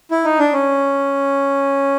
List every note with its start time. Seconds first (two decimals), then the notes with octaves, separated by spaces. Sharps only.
0.11 E4
0.24 D#4
0.39 D4
0.53 C#4